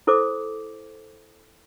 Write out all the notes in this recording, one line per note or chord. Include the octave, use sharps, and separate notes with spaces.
E4 A4 C5 D6